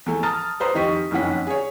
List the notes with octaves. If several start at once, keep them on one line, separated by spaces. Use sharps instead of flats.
E2 A3
A5 A#5 D#6 F6 A6
B4 C5 A#5 D#6
F1 D#3 G4 D#5 C#6 B6
F#1 F2 D#3 C#4 F#5 B6
G#4 C#5